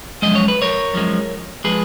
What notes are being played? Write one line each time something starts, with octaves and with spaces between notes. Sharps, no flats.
F#2 F3 G#3 D#5
C#5
B4
A#4 C#5
F#2 F3 G#3
F3 G#3 G#4 B4